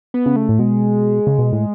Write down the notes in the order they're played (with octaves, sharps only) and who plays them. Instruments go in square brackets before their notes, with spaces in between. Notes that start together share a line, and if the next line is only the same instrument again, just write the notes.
[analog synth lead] B3
[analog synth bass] C#3
[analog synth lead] A3
[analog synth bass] A2
[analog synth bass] B2 [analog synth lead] G#3
[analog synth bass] C#3
B2
A2